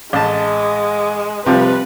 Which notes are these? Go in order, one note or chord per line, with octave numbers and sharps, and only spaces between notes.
A1 G#3 A5
C3 F3 G3 B4